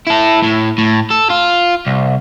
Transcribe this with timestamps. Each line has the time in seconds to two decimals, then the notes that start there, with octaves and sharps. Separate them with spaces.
0.07 E4 A4
0.44 A2
0.78 A2
1.10 A4
1.30 F4
1.86 C2